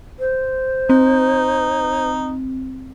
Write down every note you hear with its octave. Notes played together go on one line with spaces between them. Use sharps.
C5
C4 D#4